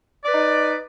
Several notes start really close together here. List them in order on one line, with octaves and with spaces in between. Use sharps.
D5 B4 D#4